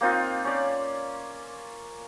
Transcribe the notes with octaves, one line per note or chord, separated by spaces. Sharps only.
A#3 C4 D#4 F4
C#4 D5